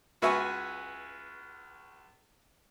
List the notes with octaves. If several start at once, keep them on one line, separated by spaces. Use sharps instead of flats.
C#2 F#4 B4 E5 G#5 C#6